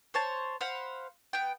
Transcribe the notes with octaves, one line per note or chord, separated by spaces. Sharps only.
C5 C#5 A5
C5 F5 F#5 B5
B3 G5